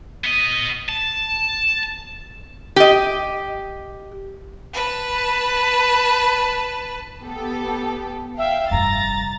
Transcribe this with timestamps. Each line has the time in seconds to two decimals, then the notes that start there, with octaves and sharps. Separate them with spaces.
0.24 B3 D#5
0.89 A5
2.76 G4 D#5
4.74 B4 A5
7.22 B3 G4 A4
8.38 E5 F5 G5
8.71 F1 G2 A#5 A6